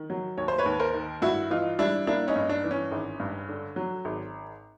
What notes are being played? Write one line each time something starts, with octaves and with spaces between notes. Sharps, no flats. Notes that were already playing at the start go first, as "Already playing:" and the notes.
Already playing: D#3
F#3
D#2 C#5
C5
B4 C#5
D#2
A#4 C5
D#3
G2 E4 F#4
E3 D#4 F4
G3 D4 E4
A#3 D4 E4
C#4 D#4
G2
D4
E3
C#4
G#1
G2
D3
F#3
G#1